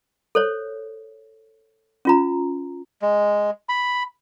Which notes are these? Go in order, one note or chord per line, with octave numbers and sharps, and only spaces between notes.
A4 C5 C#5
C#4 F4 A#5
G#3
B5